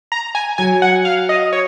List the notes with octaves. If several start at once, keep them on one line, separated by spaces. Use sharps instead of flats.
A#5
G#5
F#3 G#5
F#5
F5
D#5
C#5